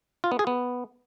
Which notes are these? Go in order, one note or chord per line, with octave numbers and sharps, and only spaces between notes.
F4
B3
G#4
B3